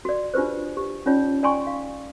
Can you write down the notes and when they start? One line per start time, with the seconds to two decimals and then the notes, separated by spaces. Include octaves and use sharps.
0.05 F#4 D5
0.34 D4 F4 G4 B4 C5
0.77 G4
1.06 C#4 D#4 F4 C#5 D5
1.43 D5 G5 G#5 C6 C#6
1.67 F5